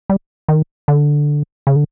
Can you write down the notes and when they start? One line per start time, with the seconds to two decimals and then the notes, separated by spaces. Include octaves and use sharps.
0.10 G3
0.48 D#3
0.88 D3
1.67 C#3
1.76 D3